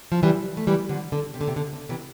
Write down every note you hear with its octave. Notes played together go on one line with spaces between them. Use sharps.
F3
E3 G3
A3
E3 G3
D3 F3
D3
C3
D3
C3
D3
D3
C3 E3